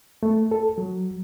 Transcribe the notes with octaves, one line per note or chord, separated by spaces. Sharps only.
A3
A4
F#3